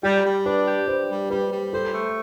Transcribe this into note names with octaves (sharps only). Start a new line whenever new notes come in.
G3 G4
G3
D4 B4
G4
D4 C5
G3
G3 B4
G3
A4 C5
A3